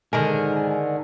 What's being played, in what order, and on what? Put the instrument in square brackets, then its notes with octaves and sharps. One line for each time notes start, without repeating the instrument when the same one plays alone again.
[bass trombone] G#2 [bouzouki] D3 D#3 A#4 [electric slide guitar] G#5